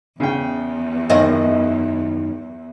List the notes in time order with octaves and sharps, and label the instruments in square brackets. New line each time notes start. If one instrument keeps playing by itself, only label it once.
[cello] E2 [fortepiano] C#3 G5
[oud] F#2 D#3 D#5